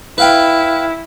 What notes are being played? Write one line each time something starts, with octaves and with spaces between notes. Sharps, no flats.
E4 B4 F5 G5